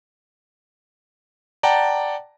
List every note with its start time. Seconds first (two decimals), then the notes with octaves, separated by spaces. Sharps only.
1.63 D5 F#5 G5 A5 A#5